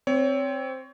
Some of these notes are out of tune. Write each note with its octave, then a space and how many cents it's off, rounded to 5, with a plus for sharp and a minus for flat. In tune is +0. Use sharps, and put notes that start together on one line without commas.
C4 +0 C#5 +25